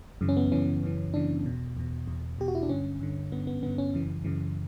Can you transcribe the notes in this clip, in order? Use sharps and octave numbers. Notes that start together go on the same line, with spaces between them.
F#2 C#3 E3
C#4
B3
F#2 C#3 E3 C#4
F#2 C#3 E3
F#2 C#3 E3 D4
E2 B2
E2 B2
E2 B2
E2 B2 G4
F#4
E4
D4
G2 D3 C#4
G2 D3
G2 D3 B3
B3
G2 D3 B3
C#4
F#2 C#3 E3
F#2 C#3 E3